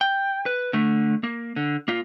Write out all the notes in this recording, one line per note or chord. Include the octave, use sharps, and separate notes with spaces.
G5
B4
D3 A3
A#3
D3
A#3 F4